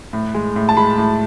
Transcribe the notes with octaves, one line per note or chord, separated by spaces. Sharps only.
A2
G#3
A2
A5
G#3 B5
A2